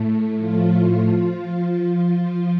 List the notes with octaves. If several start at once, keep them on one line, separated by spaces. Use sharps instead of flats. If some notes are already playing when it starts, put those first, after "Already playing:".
Already playing: A2 A3
F3 F4
F3 F4